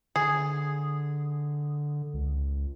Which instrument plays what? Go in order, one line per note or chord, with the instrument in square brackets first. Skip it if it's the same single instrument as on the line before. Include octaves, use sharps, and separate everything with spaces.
[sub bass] D3 [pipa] G#4
[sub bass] C#2